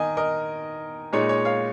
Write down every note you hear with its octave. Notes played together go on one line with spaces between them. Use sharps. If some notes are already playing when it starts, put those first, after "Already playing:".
Already playing: D#3 A#4 D#5 G#5
A#4 D#5
A#2 G#3 D#4 C#5
C#5
C#5 F5